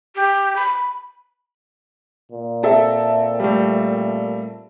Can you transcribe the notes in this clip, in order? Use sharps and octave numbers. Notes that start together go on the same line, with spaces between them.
G4
B5
A#2
C4 A4 E5
G3 A3